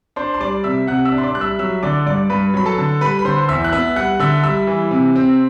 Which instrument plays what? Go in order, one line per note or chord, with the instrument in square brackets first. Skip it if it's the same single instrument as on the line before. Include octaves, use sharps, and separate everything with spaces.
[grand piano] D4 C5 C6
C6
G3 D5 D6
C3 E5 E6
C3 F#5 F#6
E5 E6
D4
C6
D5 D6
G3 F#6
E5 E6
F#3 E5 E6
D3 D5 D6
G2 D5 D6
G2 B4 B5
F#3 B5
A4 A5
D3
G3 B4 B5
B5
D3 C5 C6
E2 E5 E6
F#6
B3 E5 E6
G3 F#5 F#6
D3 E5 E6
G3 E5 E6
E3
C3
C4